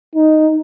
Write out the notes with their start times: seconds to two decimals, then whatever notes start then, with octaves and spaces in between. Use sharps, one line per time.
0.15 D#4